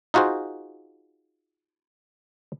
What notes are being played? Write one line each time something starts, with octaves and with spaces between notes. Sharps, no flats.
D#4 F4 F#4 G#4 C5